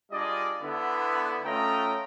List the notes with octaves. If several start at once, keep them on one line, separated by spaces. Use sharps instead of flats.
G3 D4 F4 G#4 D5 D#5
D3 B3 E4
A3 C#4 F4 D#5 G5 A#5